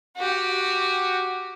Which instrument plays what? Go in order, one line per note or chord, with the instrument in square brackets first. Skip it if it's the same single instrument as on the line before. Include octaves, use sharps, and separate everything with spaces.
[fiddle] F#4 G4